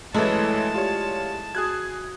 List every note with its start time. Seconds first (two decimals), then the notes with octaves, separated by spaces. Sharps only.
0.14 F#2 E3 G#3 A3 E4 G#4 C#5 A5
0.74 F4 G4 C#5 D5
1.55 F#4 G#4 D#6 F#6 G#6